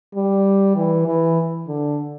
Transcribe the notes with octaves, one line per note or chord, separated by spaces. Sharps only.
G3
E3
E3
D3